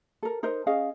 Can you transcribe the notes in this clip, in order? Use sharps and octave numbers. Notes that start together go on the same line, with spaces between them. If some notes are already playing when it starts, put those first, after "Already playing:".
A4 A#4
D#4 A#4 C5 D#5
C#4 G#4 D#5 F5